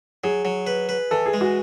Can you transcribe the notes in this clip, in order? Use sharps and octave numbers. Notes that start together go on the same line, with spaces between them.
F#3 G#4
F#3
B4
B4
E3 A4
G#4
G#3
F#4